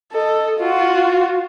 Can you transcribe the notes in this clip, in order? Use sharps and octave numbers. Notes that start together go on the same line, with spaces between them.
A4 D#5
F4 F#4